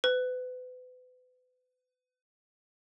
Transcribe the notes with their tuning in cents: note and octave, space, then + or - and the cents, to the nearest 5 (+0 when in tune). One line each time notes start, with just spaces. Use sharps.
B4 +35